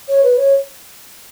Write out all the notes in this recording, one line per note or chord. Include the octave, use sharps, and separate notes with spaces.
C#5
B4
C#5